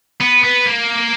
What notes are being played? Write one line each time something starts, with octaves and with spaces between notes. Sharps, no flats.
B3
B3
A#3